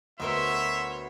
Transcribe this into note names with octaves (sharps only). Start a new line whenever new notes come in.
D2 B3 A#4 C5 C#5 D#5 E5